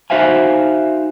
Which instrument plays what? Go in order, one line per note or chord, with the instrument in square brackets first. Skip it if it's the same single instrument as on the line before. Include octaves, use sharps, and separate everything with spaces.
[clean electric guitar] D#4 F#4 C5 E5 F5 G#5